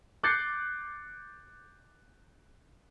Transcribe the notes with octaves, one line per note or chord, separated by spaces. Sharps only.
D6 F#6 G6 A6 C7 C#7